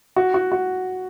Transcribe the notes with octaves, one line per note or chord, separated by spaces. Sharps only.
F#4
F#4
F#4